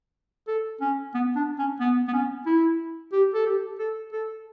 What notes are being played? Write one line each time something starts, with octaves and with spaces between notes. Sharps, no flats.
A4
C#4
B3
D4
C#4
B3
B3
C#4
E4
G4
A4
G4
A4
A4